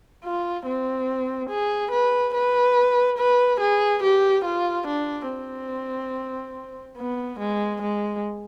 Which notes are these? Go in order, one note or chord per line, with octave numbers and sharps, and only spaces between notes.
F4
C4
G#4
B4
B4
B4
G#4
G4
F4
D4
C4
B3
G#3
G#3